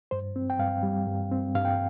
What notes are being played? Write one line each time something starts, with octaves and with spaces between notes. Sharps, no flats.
G2 C5
C4
G5
G2 F5
G3
G2
C4
G2 F5
G5